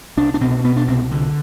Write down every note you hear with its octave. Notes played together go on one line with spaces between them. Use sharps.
C2 D4
D4
B2 C4
B2 B3
D4
C2 C4
D3